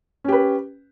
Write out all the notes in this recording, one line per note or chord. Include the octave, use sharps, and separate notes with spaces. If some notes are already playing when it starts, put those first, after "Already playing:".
C#4 G4 B4